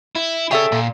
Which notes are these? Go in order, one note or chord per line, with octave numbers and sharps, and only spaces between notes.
E4
G#4 A4 C#5 E5 G5
A#2